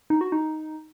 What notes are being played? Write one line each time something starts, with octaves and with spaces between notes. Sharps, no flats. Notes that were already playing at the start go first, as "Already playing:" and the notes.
D#4
F#4
D#4